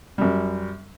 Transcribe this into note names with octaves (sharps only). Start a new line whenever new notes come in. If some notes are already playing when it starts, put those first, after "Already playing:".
F#2 G3